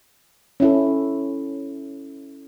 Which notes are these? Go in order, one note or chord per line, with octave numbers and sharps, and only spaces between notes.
C#4 E4 A4